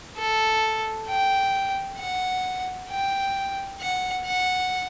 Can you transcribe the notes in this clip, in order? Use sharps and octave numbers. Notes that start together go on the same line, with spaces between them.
A4
G5
F#5
G5
F#5
F#5